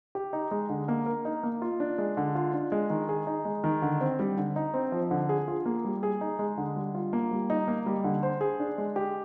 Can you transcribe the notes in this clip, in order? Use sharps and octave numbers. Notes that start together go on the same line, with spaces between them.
G4
D#4
G#3
D3
A#3
A#4
D#4
A#3
F4
D4
G#3
D3
F4
D4
G#3
D#3
G#4
D#4
G#3
D#3
D3
C4
G3
D3
D#4
C4
F3
D3
G#4
F4
A#3
G3
G#4
D#4
G#3
D3
G3
F4
A#3
G3
D#4
A#3
G3
D3
C5
G#4
D4
G#3
G4